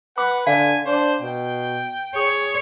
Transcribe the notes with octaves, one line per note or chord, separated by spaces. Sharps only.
B4 F#5 D6
D3 F5 G#5
D4 C5
B2 G5
G#4 C#5